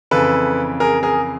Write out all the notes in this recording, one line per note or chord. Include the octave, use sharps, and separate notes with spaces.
F2 C#3 E3 A4 B4
G#4 A#4
G#4 A#4